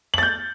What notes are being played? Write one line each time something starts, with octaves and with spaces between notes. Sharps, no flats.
G6 A6 F#7